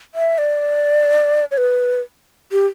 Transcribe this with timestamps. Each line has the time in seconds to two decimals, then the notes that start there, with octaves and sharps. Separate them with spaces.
0.15 E5
0.38 D5
1.51 C#5
1.57 B4
2.52 G4